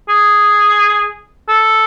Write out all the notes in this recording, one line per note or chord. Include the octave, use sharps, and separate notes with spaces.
G#4
A4